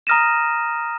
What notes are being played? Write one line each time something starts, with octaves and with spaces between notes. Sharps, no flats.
A#5 D#6 F6 A#6 D#7 E7